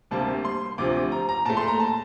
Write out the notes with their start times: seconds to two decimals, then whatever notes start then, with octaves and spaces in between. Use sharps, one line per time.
0.11 D2 C3 G3 A#3 A5
0.45 C6
0.78 D2 C3 F3 D6
1.12 A#5
1.29 A#5
1.45 A#2 A5
1.50 A3
1.57 C6
1.68 A#5
1.80 A5